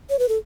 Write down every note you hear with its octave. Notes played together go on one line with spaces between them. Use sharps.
C#5
B4
A4